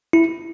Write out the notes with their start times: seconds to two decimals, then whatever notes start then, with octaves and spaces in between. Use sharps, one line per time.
0.13 E4